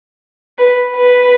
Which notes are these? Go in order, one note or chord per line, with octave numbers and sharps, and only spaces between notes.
B4
B4